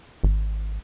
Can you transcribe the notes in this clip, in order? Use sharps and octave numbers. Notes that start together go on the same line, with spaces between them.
G#1